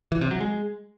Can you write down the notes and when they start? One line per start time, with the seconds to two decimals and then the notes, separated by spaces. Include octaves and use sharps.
0.12 E3
0.21 C3
0.31 F#3
0.40 G#3